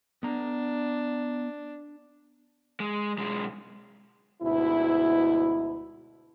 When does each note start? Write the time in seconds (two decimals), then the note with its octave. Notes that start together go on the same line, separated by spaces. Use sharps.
0.23 B3 D4 A#5
2.80 G#3
3.18 B1 G#3
4.41 D2 G#2 B2 E4